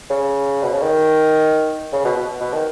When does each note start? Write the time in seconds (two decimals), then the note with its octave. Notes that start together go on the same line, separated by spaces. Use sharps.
0.10 C#3
0.63 B2
0.73 C#3
0.82 D#3
1.93 C#3
2.05 B2
2.17 B2
2.40 B2
2.53 D#3